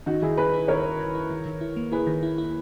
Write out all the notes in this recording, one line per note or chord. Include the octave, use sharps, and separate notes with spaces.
D#3 D#4 F#4
D#3 E4 G#4
D#3 G#4 B4
E4
D#3 A#4 C#5
D#3
D#3
E4
D#3
D#3
E4
A#3
E4 G#4 B4
D#3
E4
E4